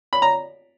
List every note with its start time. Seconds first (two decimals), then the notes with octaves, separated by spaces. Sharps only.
0.13 B5
0.22 A#5